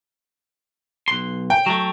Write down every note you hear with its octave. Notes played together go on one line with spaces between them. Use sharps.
B1 C6
G5
F#3 A3